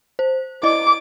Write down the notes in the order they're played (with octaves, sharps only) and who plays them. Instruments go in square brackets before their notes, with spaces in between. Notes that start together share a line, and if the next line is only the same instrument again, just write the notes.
[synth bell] C5
[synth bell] E4 D5 D#5 [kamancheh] D6